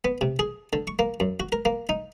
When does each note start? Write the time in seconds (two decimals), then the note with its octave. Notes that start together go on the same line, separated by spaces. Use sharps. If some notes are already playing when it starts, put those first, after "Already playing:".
0.05 B3
0.21 C3
0.39 G#4
0.73 D3
0.87 C#6
0.99 A#3
1.20 F#2
1.40 F#4
1.52 A#4
1.65 A#3
1.89 D#4